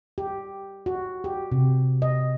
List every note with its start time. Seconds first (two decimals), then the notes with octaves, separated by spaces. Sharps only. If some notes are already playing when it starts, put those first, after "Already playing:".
0.18 G4
0.86 F#4
1.24 G4
1.52 C3
2.02 D#5